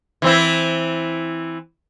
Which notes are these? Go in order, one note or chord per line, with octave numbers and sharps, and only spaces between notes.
E3 C4 E4